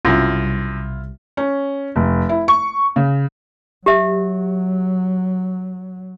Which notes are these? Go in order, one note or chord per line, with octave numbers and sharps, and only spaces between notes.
B1 F#2 C3 G3 E4 F4
C#4
F1
E4
C#6
C#3
F#3 G4 E5